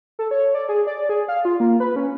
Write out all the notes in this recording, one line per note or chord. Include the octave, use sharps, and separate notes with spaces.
A4
C#5
D5
G#4
D5
G#4
F5
F4
A#3
B4
C#4